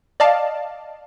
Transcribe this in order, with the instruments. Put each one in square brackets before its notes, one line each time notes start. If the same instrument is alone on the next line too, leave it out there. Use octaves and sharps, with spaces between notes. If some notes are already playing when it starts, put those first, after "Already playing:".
[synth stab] D5 D#5 F5 A5